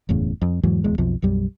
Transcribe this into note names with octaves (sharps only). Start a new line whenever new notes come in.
F#1 E2 A2 C#3
F2
E2 G#2 E3 F#3
D1 E2 G#3
B1 F2 F3
B1 F#2 G3